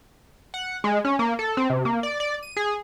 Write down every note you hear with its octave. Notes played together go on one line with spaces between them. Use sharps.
F#5
G#3
C#4
A#3
A4
C4
C3
A#3
D5
D5
D#7
G#4